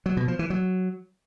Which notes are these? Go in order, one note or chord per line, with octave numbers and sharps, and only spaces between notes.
F#3
B2
F3
E3
F#3